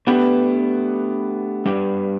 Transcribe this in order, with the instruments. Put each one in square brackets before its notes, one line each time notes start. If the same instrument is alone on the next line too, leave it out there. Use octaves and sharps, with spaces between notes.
[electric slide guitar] A3 D4 G4 B4 [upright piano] B3
[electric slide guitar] G3 D4 G4 B4